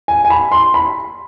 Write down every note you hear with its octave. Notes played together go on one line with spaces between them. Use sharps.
G#5
G#5
B5
C6
B5